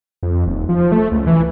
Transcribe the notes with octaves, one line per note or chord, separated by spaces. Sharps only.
F2
D#1
F3
A3
C#2
E3